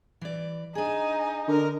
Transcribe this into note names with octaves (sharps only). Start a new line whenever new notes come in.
E3 D5
D4 D#4 G#4 G#5
D3 A#4